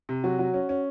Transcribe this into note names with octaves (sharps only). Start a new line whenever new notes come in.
C3
F#3 F#4
F#3
C#4
C#4